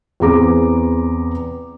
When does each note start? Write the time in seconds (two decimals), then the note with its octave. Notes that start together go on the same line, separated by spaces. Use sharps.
0.20 E2 C4 G#4 A#5 D6